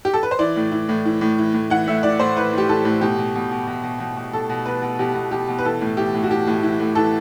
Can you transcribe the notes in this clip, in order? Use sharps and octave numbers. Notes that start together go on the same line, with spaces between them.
G4
A4
B4
C5
E3 D5
A2
E3
A2
E3
A2
E3
A2
E3 F#5
A2 E5
E3 D5
A2 C5
E3 B4
A2 G4
E3 A4
A2
B2 G4
B2
B2
B2
B2
B2
B2
B2
B2 A4
B2
B2 B4
B2
B2 G4
B2
B2 G4
B2
B4
E3 A4
A2
E3 G4
A2
F#4
E3 G4
A2
E3
A2
E3 A4